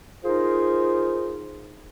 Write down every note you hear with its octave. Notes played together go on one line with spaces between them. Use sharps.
D#4 F4 G#4 A#4 C5